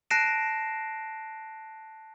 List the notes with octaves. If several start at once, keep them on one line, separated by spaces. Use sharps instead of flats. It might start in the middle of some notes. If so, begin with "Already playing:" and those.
A5 F#6 A#6 C7 D7 E7